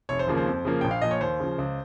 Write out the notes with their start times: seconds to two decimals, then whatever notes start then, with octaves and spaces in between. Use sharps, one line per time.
0.09 F1 C#5
0.19 C5
0.27 D#2 C#3 F3 A#3
0.37 C5
0.47 F2
0.65 C#3 F3 A#3
0.81 A#1 G5
0.91 F5
1.02 A#2 F3 D#5
1.11 C#5
1.21 D#2 C5
1.40 C#3 F3
1.58 C#2